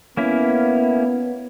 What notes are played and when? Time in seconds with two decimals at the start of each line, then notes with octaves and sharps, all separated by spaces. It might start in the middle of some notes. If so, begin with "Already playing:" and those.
0.17 A#3 B3 C#4 E4